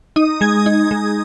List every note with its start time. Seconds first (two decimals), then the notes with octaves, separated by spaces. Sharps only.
0.16 D#4 D#6
0.41 G#3 G#6
0.66 D#4
0.91 G#3